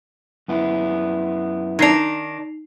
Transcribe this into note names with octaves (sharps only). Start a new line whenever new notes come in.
F#2 B3 E4
D#3 D4 D#4 C7 F7